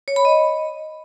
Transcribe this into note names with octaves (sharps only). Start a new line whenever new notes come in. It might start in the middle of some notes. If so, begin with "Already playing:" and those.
C#5
B5
D#5